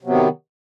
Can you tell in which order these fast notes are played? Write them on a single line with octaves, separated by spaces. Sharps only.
C3 F#3 B3 D#3